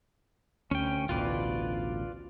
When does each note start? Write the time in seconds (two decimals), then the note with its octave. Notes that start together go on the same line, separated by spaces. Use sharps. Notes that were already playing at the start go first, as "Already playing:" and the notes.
0.71 D2 C#4 G5
1.09 A1 D2 B2 F4 B4 D5